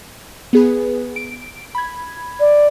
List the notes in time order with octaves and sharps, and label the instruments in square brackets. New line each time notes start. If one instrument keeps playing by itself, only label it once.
[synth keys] B3 G#4 B4
D7
B5 G#6
[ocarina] D5